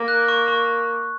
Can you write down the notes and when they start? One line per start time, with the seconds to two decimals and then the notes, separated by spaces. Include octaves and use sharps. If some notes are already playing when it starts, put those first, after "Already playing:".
Already playing: A#3
0.08 F#6
0.28 C#6
0.48 C#6